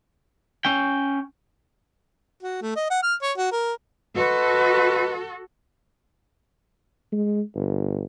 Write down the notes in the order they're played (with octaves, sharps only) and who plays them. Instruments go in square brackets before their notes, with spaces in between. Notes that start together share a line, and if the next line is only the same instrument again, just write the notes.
[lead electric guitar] C#4 G5
[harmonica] F#4
A3
D#5
F#5
F6
C#5
F#4
A#4
[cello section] F#4 A4 [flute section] B4 D#5 C6
[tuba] G#3
G1